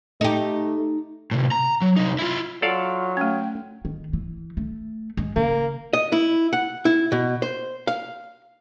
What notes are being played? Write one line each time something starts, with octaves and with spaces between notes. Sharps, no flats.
A3 D#4 G4
A2 C3
A#5
F#3
C2 D#4
E4 F4
F#3 F4 A4 D5 F5
A3 C#4 G5
D#3
E3
A3
G#3
C#3 A#3
D#5
E4
F#5
E4
B2
C5
F5